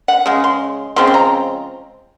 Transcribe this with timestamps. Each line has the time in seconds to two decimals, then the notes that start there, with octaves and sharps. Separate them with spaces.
0.08 F#5
0.26 C#3 G#3
0.44 C6
0.96 C#3 F3 G#3 C4 C6
1.07 C6
1.14 A#5